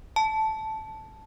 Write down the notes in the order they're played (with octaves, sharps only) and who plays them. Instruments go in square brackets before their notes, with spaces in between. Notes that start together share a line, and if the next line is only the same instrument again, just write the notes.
[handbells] A5